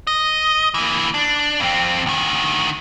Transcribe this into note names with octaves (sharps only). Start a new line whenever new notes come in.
D#5
E3 A#3
D4
F2 C4
D2 D#3